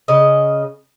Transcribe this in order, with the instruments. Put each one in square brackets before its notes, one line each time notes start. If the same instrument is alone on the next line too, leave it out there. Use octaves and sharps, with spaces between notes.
[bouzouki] C#3 D#5